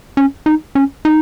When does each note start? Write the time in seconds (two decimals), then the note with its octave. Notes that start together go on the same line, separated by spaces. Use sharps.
0.17 C#4
0.46 D#4
0.75 C#4
1.05 D#4